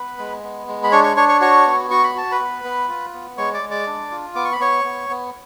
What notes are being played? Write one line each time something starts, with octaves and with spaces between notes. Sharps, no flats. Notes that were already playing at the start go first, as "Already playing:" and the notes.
Already playing: B3 B4 B5
G#3
B3
G#3
B5
D4 C#5 C#6
C#5 C#6
D4 C#5 C#6
C#5 C#6
F#4 C#5 C#6
B3
F#4 C#6
B5
F#4 A5
B4 B5
B3
B3
F4
B3
G#3 C#5 C#6
D5 D6
G#3
D5 D6
D4
F4
B3 D6
C#6
B5
B3 C#5 C#6
B3
B3